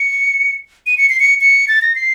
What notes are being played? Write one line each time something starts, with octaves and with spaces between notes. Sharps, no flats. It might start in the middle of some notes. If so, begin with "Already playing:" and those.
Already playing: C#7
D#7
C#7
C7
C#7
C#7
A6
A#6
C7